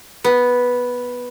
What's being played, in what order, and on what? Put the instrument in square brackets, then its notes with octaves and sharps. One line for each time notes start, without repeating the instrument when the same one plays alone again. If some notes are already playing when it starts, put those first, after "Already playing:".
[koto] B3